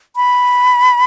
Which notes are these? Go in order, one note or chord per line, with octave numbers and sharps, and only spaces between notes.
B5